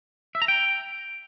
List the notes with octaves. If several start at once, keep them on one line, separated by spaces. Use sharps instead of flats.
E5
A#5
G5